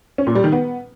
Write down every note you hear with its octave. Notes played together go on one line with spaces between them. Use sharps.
C#4
A#2
G3
D#3
B3